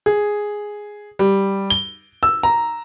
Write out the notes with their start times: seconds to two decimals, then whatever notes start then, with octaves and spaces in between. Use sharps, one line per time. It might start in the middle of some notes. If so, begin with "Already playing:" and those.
0.06 G#4
1.19 G3
1.70 G7
2.23 E6
2.43 A#5